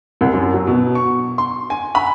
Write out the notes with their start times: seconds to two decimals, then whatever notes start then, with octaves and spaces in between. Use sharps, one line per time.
0.21 C2
0.33 F#2
0.54 F#3
0.67 B2
0.95 C#6
1.38 C6
1.70 G#5
1.95 B5